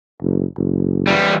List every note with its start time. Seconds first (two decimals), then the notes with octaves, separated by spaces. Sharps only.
0.21 F#1
0.57 F#1
1.07 E3 G3